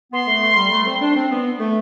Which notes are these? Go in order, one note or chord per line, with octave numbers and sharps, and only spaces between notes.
B3 C6
A3
A3
G3
A3
C4
D4
C4
B3
A3